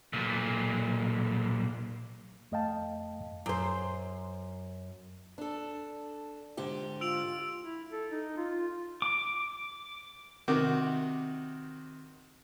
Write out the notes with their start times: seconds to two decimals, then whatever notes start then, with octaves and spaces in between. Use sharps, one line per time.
0.13 B1 A#2
2.52 F2 A3 D#5 F5 G5 A5
3.46 F#2 C5
5.38 D4 A4
6.57 G#2 D3 G4
7.01 F4 E6 D7 F7
7.62 E4
7.91 A4
8.12 D#4
8.37 F4
9.02 D6
10.48 C3 D#3 F#4 D6